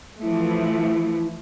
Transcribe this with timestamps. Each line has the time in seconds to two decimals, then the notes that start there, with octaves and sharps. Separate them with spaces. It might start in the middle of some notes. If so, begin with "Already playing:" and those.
0.22 E3 F3 A3 E4